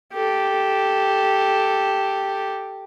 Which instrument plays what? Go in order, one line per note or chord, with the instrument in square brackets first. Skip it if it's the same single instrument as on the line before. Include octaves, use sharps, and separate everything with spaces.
[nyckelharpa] G4 A4